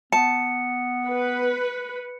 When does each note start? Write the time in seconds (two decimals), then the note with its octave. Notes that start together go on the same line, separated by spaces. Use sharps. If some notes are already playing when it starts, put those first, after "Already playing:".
0.12 B3 A5 C#7
1.08 B4